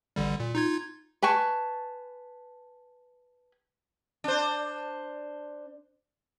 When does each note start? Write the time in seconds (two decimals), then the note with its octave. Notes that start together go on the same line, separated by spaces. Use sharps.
0.16 A1 D3 G3
0.40 A#2
0.55 D#4 F4 G#6
1.22 B4 G#5 A5 C#6
4.24 D4 C5